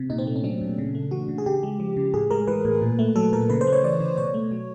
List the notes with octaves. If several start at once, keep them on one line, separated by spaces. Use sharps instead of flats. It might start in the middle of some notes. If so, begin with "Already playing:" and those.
Already playing: C3
A#2 D#4
C4
A3
C#4
F#3 D4
A#2
C#3
A3
E3 F#4
C#3
G#4
C#3 G4
G#3
F3
C#3
A2 G#4
G#3 A#4
E3 B4
A2
A#2
A3
F#3 A4
A#2 A#4
C#3 B4
C5
A3
C#5
E3 D5
C#3
B2 C#5
A3
F#3